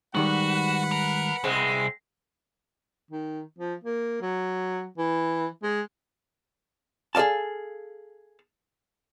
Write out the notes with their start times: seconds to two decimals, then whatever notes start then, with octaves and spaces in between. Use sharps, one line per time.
0.15 G#2 D#3 G3 F#4 B4 F#5 B5
0.91 A#4
1.44 C2 G#3 C4
3.11 D#3
3.59 F3
3.84 A#3
4.22 F#3
4.98 E3
5.63 G#3
7.15 G#4 A4 D#5 F5 A5